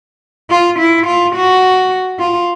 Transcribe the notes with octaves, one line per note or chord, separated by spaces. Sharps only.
F4
E4
F4
F#4
F4